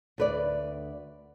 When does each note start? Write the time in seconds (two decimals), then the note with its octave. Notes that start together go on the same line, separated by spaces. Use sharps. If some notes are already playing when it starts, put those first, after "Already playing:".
0.18 D2 B4 D5